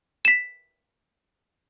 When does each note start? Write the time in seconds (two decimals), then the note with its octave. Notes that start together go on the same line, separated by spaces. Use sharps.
0.25 B6 E7